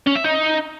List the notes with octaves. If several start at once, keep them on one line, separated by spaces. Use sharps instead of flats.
C#4
E5
D#4